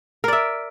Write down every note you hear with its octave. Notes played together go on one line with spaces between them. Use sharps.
A#4 D5 E5